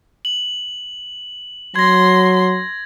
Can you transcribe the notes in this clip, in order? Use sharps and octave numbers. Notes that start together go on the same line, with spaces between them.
F#7
F#3 C6 G#6 A#6